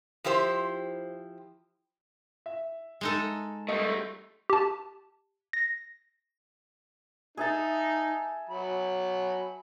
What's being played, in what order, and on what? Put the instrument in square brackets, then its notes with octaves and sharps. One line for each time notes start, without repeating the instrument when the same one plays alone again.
[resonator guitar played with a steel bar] F3 E4 G4 C5
[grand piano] E5
[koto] G#3 D#4 A4
[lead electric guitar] G3 A3 [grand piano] D#5
[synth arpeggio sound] G4 A5
A#6
[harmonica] D#4 [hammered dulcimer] G#4 E5 A5
[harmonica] F#3 B5